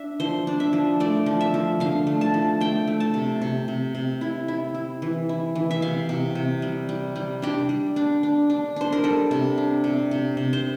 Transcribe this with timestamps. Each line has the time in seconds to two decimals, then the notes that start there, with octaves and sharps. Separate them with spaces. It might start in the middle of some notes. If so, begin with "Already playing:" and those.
Already playing: D4 E5
0.20 F3 C5
0.47 D4
0.60 E5
0.73 F3
1.00 A3 D5
1.26 F3
1.41 E5
1.54 F3
1.80 D3 F5
2.07 A3
2.21 A5
2.34 F3
2.61 A3 G5
2.87 A3
3.00 A5
3.14 C3
3.41 C3
3.68 C3
3.95 C3
4.21 E4
4.48 E4
4.74 E4
5.02 E3
5.29 E4
5.55 E3
5.71 E5
5.82 C3 F5
6.09 C3
6.35 C3
6.62 G3
6.89 G3
7.16 G3
7.42 D4 G4
7.69 G3
7.96 D4
8.23 D4
8.50 D4
8.76 D4 C5
8.92 A#4
9.04 G3 A4
9.31 C3
9.58 D4
9.84 C3
10.11 C3
10.37 C3
10.53 C5